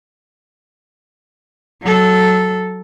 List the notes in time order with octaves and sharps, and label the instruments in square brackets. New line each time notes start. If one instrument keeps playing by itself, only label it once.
[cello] F#3 A4